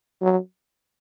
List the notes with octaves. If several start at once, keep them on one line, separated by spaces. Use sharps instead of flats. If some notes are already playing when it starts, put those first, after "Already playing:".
F#3